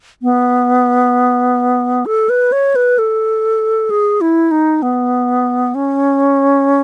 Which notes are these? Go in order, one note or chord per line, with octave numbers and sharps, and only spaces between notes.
B3
A4
B4
C#5
B4
A4
G#4
E4
D#4
B3
C#4